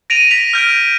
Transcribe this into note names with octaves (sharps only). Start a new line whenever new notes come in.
A#6 D7 D#7 F7
A#6 B6 F7
F6 G6 A#6 D7